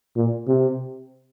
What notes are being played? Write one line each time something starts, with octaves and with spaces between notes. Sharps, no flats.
A#2
C3